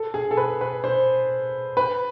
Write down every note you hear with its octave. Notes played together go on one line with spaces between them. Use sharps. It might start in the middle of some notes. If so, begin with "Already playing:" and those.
Already playing: A4
G#4
A4
B4
B4
C5
B4